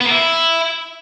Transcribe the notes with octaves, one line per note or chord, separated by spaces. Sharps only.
B3
A#3
E4